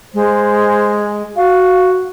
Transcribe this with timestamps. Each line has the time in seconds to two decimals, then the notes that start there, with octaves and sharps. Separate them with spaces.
0.14 G#3 C5
1.36 F#4 F5